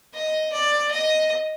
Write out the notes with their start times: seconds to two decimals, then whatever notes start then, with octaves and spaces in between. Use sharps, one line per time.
0.14 D#5
0.52 D5
0.91 D#5